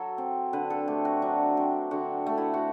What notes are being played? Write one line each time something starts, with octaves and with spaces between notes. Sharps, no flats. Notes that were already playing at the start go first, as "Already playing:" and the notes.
Already playing: F#3 A4
C4
D3 B4
A4
A3 G4
F#4
F#3 D4
C4
D3 F#4
A3
E4
F#4